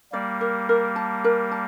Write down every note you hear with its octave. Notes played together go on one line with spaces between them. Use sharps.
G3 A#3 D5
A#4
A#4
A5
A#4
A5